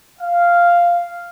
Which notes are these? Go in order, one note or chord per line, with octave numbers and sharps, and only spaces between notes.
F5